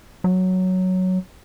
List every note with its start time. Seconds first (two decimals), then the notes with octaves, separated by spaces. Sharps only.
0.24 F#3